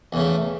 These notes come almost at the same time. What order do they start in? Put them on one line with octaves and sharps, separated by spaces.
E2 C#3 A3